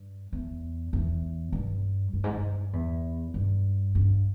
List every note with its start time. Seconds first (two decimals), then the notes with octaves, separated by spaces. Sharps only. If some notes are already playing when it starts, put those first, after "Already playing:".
Already playing: G2
0.33 E2
0.93 E2
1.52 G2
2.13 G2
2.24 G#2
2.35 G2
2.73 E2
3.34 G2
3.95 G2